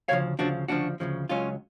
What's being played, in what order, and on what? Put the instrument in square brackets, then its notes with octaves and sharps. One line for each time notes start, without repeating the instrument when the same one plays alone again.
[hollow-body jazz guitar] D2 C#3 F3 C#5 F5
D2 C#3 F3 D4 F#4
D2 C#3 F3 D4 F#4
D2 C#3 F3
C#2 C#3 F#3 C#4 F4